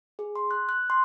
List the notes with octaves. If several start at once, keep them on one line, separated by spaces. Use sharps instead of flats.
G#4
C6
F#6
F#6
C6